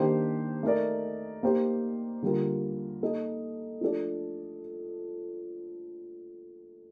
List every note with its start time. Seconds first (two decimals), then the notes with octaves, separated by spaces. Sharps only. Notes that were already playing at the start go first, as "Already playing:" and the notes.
Already playing: D#3 A#3 D4 G4 C5
0.63 A3 D#4 A#4 D5
1.43 A#3 D#4 G4 C5
2.22 D3 G3 A#3 F4 A#4
3.02 A#3 D#4 A4 D#5
3.81 F3 A3 D4 A4 D5